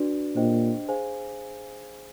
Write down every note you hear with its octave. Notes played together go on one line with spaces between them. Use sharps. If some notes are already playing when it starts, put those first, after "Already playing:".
Already playing: D4 F#4 B4 D5
A#2 D4 G4 C5 D#5 G5
G#4 C5 F5 G#5